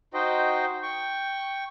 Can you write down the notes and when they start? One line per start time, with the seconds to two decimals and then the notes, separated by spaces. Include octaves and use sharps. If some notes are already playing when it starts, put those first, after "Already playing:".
0.14 D#4 F#4 C5 D#5 G5
0.83 G5 C#6